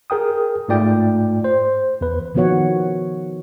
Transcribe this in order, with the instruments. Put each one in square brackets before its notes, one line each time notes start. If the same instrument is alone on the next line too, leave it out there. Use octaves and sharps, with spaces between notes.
[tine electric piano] G#4 A#4 G5 D#6
G#2 A3 F4 D5 G5
C5
E2 B4
[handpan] D#3 F3 B3 F#4 C#5 F#5